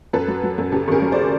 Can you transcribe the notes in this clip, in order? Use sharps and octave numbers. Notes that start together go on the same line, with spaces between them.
F#2 A4 B4
F#3
F#3
F#2
C#3 G4 A4
G#1 G#4 A#4
F#3
C5 D5